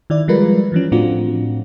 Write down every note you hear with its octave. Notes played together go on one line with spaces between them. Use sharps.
D#3 E4 D5
F3 G3 G#3 F4 A#4 B4
E3 F3 C#4
A2 A3 C4 D4 F4 F#4